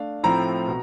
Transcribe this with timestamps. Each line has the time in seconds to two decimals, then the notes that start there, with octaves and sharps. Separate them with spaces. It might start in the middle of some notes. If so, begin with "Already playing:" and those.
Already playing: A3 D4 F5
0.23 A2 F3 A3 C4 E4 A#5
0.68 B2